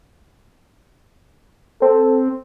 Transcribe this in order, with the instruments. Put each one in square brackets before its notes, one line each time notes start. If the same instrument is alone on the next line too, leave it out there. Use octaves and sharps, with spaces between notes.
[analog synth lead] C4 [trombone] A4